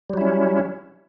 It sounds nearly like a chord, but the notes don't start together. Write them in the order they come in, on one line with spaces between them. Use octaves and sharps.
G3 F#3 E4 C#4